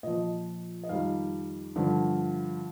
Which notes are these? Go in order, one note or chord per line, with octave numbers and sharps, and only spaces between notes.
A#2 F3 D#5
D#5
F2 D#3 G3 F5
G2 D3 F3